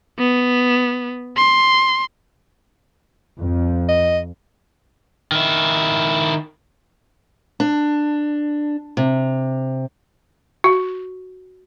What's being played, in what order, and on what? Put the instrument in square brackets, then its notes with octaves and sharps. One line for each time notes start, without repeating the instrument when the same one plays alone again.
[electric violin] B3
C6
[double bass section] F2
[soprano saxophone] D#5
[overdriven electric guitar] D#3 E4
[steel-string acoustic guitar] D4
C3
[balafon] F#4